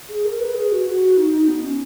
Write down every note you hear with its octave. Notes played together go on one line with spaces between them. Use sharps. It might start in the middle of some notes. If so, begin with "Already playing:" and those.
G#4
A#4
B4
G#4
F#4
F#4
D#4
D#4
B3
C#4